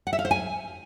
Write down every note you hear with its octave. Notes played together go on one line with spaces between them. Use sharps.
F#5
E5
F5
C5
G#5